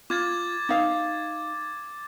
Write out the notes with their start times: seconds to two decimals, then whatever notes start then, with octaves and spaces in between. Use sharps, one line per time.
0.10 F4 D6 G#6 A6
0.69 D#4 F5